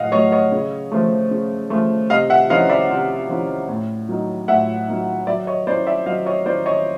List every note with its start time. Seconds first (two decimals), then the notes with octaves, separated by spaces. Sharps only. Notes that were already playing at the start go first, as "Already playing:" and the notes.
Already playing: A2 F#3 A3 D#5 F5 F#5
0.12 F#3 A3 C#5 D#5
0.32 C#5 D#5
0.52 C#3
0.92 F3 A3
1.31 C#3
1.70 F3 A3
2.10 C3 D#5 F5
2.30 E5 F#5
2.50 F3 A#3 C#4 E4 D#5 F5
2.69 D5 E5
2.90 C3
3.29 F3 A#3 C#4 E4
3.68 A2
4.09 F#3 A#3 D#4
4.48 A2 E5 F#5
4.88 F#3 A#3 D#4
5.27 F#3 D5 E5
5.47 C#5 D#5
5.67 A#3 C#4 E4 C5 D5
5.87 D5 E5
6.06 F#3 D#5 F5
6.26 C#5 D#5
6.46 A#3 C#4 E4 C5 D5
6.66 C#5 D#5